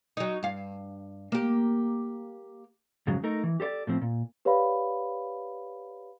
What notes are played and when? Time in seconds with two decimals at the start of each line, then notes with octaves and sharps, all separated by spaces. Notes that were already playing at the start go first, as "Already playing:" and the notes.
0.17 F#3 D#4
0.43 G2 F5
1.32 A#3 G4
3.07 F2 G#2 C#3 F#3 G#3
3.24 A3 D#4 A#4
3.43 E3
3.60 G4 A4 C5 D5
3.87 A2 F3 C4
4.02 A#2
4.45 G4 B4 C#5 D5 F5 B5